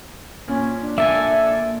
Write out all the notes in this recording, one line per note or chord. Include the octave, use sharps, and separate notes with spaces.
A#2 C#4
D4
A#3 A4 E5 G#5